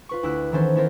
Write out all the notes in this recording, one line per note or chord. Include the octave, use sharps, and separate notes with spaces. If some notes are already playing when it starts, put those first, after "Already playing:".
F4 B4 C#6
D2 E4 B5 E6 F#6
D#3 E3 B3 C#4 A4 C5
B3 E4 A4 A#4 C5